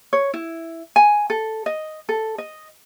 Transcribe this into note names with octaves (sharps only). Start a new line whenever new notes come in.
C#5
E4
G#5
A4
D#5
A4
D#5